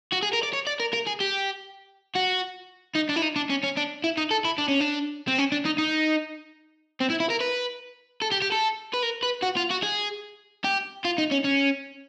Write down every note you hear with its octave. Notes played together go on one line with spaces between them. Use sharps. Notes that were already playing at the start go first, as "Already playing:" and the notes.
F#4
G#4
A#4
D5
C#5
D5
A#4
A#4
G#4
G4
F#4
D#4
D4
E4
D#4
D4
C#4
C#4
D4
E4
D#4
A4
E4
D4
C#4
D4
C4
C#4
D4
D#4
D#4
C4
E4
E4
A#4
B4
A4
G4
G4
A4
B4
A#4
B4
F#4
F4
F#4
G#4
G4
F4
D#4
C#4
C#4